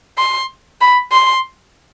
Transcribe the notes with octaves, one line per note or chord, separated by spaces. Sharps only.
C6
B5
C6